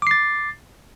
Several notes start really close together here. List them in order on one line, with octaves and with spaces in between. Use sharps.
D6 C7 A6